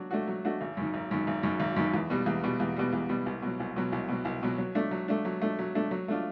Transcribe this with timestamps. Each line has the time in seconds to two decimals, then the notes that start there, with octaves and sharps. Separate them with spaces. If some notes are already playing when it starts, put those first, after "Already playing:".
Already playing: F#3 D4 F#4
0.11 A3 D4 F#4
0.28 F#3
0.45 A3 D4 F#4
0.61 G#1
0.77 F#2 D#3
0.94 G#1
1.11 F#2 D#3
1.27 G#1
1.43 F#2 D#3
1.60 G#1
1.76 F#2 D#3
1.94 E2
2.10 B2 G3
2.26 E2
2.44 B2 G3
2.60 E2
2.76 B2 G3
2.93 E2
3.09 B2 G3
3.26 C2
3.42 B2 F#3
3.60 C2
3.76 B2 F#3
3.92 C2
4.08 B2 F#3
4.25 C2
4.43 B2 F#3
4.58 F#3
4.75 A3 D4
4.91 F#3
5.08 A3 D4
5.25 F#3
5.41 A3 D4
5.59 F#3
5.75 A3 D4
5.91 F#3
6.08 A3 D4 F4